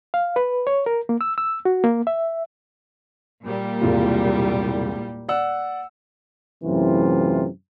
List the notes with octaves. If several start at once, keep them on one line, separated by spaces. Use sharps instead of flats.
F5
B4
C#5
A#4
A#3
E6
E6
F#4
A#3
E5
A#2 G3
E1 C2 F4
D5 F#5 E6
F#2 A2 C3 E3 F4